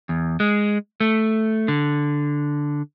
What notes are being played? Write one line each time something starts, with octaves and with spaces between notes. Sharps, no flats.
E2
G#3
A3
D3